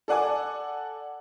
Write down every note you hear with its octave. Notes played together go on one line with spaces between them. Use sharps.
A4 D5 F#5 G#5 D6